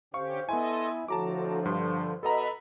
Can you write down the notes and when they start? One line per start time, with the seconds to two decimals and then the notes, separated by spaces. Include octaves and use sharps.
0.14 D3 C#4 G4 C5 F5 C#6
0.49 B3 E4 A4 D#5 G#5 C6
1.08 A2 D3 F3 F#4 A5 A#5 D6
1.65 G2 C6
2.23 B2 A4 B4 D#5 E5 A#5 B5